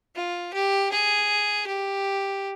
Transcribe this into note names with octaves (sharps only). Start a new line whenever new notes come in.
F4
G4
G#4
G4